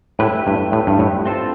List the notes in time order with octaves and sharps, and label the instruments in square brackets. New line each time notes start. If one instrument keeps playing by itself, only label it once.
[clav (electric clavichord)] A2 [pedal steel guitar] A3 E4 G4 B4
[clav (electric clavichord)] G2
A2
G2
A2
[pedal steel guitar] C4 F4 A4 C5